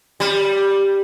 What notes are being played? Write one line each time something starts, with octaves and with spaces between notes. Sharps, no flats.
G3